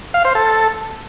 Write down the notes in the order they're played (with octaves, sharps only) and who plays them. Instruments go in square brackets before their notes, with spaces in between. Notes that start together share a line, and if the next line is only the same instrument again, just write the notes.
[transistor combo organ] F5
C5
A4